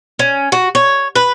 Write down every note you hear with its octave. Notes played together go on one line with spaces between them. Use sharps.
C#4
F#4
C#5
B4